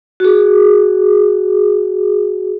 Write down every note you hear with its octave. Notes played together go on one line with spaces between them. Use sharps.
F#4 G#4